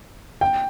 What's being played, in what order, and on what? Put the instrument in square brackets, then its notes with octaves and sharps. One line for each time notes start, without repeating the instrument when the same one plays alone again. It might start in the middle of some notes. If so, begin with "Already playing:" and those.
[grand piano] G5